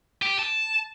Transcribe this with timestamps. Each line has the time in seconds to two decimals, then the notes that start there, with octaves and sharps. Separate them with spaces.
0.22 G4 G5
0.39 A5